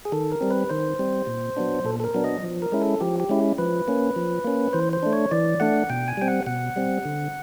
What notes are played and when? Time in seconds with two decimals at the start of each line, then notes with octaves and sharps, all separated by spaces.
0.05 G#4
0.12 D#3 A4
0.32 A#4
0.41 G3 C4
0.51 B4
0.70 D#3 C5
0.99 G3 C4
1.27 A#2
1.57 F#3 B3 D4
1.85 A#2 A4
2.00 A4
2.04 A#4
2.14 F#3 B3 D4
2.24 D#5
2.43 F3
2.62 A#4
2.72 G#3 C#4 E4
2.82 A4
3.00 F3 G4
3.20 G4
3.29 G#3 C#4 E4
3.58 F3 B4
3.88 A#3 C#4
4.16 F3
4.45 A#3 C#4
4.73 E3 C5
4.93 C5
5.03 A3 D4
5.13 C#5
5.31 E3 D5
5.60 A3 D4 F#5
5.90 B2 G5
6.08 G#5
6.17 G3 C4 G5
6.28 F#5
6.47 B2 F#5
6.76 G3 C4
7.05 D3